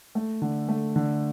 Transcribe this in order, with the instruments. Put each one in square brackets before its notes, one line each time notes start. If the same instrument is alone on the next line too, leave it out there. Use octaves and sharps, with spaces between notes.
[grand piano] A3
D3
A3
D3